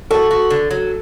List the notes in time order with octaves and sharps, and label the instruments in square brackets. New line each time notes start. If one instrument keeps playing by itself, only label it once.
[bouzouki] F#4 [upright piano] A4
[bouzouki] F#4
D3
F#3